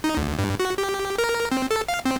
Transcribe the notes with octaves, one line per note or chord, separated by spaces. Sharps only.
D#4
D2
G2
F#4
G4
A#4
C4
A4
F5
C4